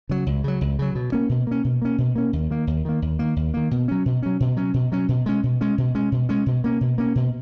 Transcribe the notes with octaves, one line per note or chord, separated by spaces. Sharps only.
C#3 F#3
C#2
C#3 F#3
C#2
C#3 F#3
B2
A#3 C#4
B2
A#3 C#4
B2
A#3 C#4
B2
A#3 C#4
D#2
D#3 A#3
D#2
D#3 A#3
D#2
D#3 A#3
D#2
D#3 A#3
B2
F#3 C#4
B2
F#3 C#4
B2
F#3 C#4
B2
F#3 C#4
B2
G#3 C#4
B2
G#3 C#4
B2
G#3 C#4
B2
G#3 C#4
B2
A#3 C#4
B2
A#3 C#4
B2